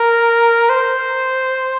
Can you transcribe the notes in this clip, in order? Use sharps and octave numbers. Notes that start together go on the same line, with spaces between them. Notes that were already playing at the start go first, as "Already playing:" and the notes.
Already playing: A#4
C5